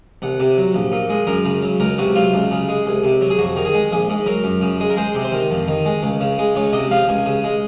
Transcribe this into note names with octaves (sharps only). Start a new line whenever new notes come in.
C2 F#5
C3
F#3
A#1
A#2
G#3
F#2 A#4
C#3
F#3
C#2 A#4
C3 F#4
F#3 F4
C#2
C#3
G#3
C2
C3
F#3
G#4
F2 F#4
D#3
G#4
G#3
A#1 G#4
G#2
F#3 A#4
F#2
C#3
G#3
A#4
G#3 C5
C3
C5
D#3
F2
D#3
G#3
C#2
C#3
G#3
C#2 C#5
C3 D#5
F3 F5
C#2 G#5
C#3
G#3